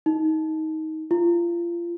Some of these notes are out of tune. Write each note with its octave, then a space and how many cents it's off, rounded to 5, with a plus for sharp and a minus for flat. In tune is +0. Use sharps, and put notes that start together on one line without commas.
D#4 +20
F4 -30